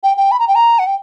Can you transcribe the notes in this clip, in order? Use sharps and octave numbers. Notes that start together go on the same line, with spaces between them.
G5
G5
B5
A#5
G5
A#5
F#5
G5